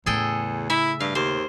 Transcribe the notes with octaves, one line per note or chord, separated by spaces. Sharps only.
E2 A2 C#3 G#4 A4 G5
E4 E5
G2 F5
D#2 C5